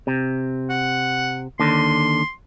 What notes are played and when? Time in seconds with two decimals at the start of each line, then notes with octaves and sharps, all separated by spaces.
0.07 C3
0.70 F#5
1.60 D#2 D3 C6